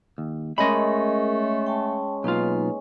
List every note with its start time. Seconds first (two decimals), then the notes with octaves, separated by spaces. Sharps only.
0.18 D#2
0.58 G#3 A3 C#4 G#4 A#4 C#5 D#5 B5
1.67 G5 A5
2.24 B1 A#3 D#4 F4 B4